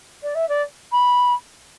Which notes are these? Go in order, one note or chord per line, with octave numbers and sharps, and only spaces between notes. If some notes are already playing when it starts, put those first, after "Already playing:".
D5
E5
D5
B5